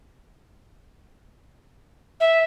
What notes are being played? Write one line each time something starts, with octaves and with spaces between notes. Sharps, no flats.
E5